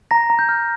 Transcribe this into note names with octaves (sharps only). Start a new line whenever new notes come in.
A#5 A#6
A#5
G6
F6